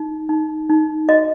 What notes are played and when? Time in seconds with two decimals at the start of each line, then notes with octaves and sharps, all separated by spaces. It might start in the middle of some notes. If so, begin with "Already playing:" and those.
Already playing: D#4
0.29 D#4
0.70 D#4
1.09 F#4 D#5